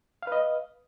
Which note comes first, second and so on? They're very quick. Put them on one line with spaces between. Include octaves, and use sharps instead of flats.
F5 B4 D#5